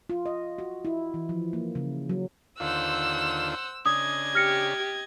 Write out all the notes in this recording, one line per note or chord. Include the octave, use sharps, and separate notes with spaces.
F4
D#5
F#4
E4
E3
F3
A#3
C#3
F#3
D#2 D3 F4 C5 F#5 E6
C#3 D4 D#5 D#6 G#6
G4 F6 A#6 C#7